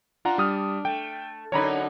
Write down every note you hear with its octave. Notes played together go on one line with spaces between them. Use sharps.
D4 F4 F#5 A#5
G3 D#6 F6
A3 G5
F#2 D3 D#4 C#5 A#5 B5